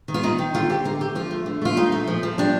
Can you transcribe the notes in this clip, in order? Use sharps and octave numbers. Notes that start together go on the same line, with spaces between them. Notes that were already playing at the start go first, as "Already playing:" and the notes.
D#3
F4
D#3 D#4
D#3
D3 F4
C4 G4
D3 A#4
A3 G4
F3 F4
A3
D3
A3 F4
A#2 D#4
A3
F3
F3
G3 D4